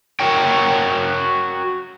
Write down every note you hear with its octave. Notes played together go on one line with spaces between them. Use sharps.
F#4 A#4 C#5 G5